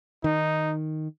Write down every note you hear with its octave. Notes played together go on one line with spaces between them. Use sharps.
D#3 D#4